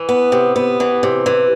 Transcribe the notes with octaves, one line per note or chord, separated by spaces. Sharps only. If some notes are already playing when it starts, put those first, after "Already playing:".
Already playing: E3
B3
C3
B3
E3
C3
E3